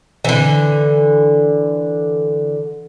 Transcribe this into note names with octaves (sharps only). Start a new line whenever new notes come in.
D3 E3